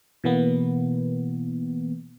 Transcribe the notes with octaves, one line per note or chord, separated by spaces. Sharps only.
B2 E3 A#3 B3